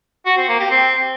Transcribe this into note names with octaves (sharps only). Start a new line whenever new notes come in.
F#4
C4
A#3
G4
C4